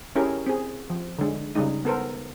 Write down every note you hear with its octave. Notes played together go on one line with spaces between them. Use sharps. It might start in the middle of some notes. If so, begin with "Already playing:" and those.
C#4 E4 G4 G#4 A#4
C4 G#4
F3
D3 G#3
C#3 G3 G#3 D#4
B3 A4 A#4 C5